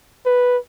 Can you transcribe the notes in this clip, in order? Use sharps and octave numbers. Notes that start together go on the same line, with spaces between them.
B4